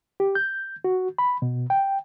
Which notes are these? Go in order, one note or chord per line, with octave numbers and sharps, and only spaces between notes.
G4
G6
F#4
B5
B2
G5